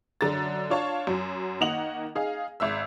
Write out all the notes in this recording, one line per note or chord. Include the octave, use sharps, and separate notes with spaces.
F#2 D3 A#5 A6
D4 F4 C#5 F5 A5 C#6
F#2 F#3
D#3 A#3 D#5 F#5 F7 F#7
D#4 G#4 F5
G#1 E5 E6